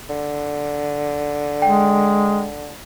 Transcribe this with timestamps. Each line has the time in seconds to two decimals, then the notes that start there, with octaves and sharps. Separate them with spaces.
0.10 D3
1.62 G#3 G5